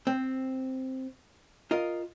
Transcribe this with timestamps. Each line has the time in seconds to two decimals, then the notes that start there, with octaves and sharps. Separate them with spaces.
0.07 C4
1.71 F4 A#4 D#5